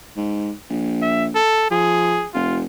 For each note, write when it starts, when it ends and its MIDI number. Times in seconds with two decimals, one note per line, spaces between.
0.16 0.52 44
0.70 1.36 34
1.02 1.26 76
1.35 1.71 69
1.71 2.22 53
1.71 2.29 68
2.34 2.65 29
2.34 2.60 65